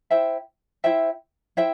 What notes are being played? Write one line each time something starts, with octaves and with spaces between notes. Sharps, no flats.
E4 C5 E5 G5
E4 C5 E5 G5
E4 C5 E5 G5